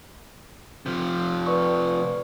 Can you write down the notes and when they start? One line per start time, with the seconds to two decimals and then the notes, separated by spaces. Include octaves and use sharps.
0.86 C3 F3
1.47 B4 D5 C#6